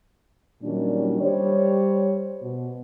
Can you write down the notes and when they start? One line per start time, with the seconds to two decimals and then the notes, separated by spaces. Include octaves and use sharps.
0.62 A#2 D#3 F#3 G3 C#4 D4
1.21 G3 C5 C#5
2.43 B2